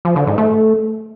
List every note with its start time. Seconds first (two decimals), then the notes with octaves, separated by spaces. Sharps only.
0.05 F3
0.16 D3
0.27 G#2
0.38 A3